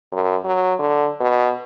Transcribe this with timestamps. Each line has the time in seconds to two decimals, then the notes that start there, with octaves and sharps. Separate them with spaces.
0.13 F#2
0.45 F#3
0.79 D3
1.20 B2